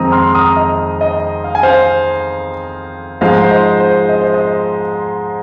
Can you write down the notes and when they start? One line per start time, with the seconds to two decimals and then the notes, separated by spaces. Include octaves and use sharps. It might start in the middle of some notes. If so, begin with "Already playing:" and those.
Already playing: F2 D#3 G#3 C4 A#5 D#6
0.12 C6 F6
0.29 F6
0.35 A#5 D#6
0.57 D#5
1.01 D#5
1.44 F5
1.55 G#5
1.63 C5 F5
3.21 G#2 F3 G#3 C5 F5
3.44 C5
3.51 D#5
3.80 C5
4.09 D#5
4.21 C5
4.34 D#5